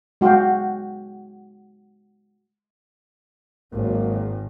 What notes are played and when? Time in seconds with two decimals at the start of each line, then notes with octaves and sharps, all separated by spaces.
0.21 G#3 F#4 G#4 F5 G5
3.73 G#1 F#3 G#3 A#3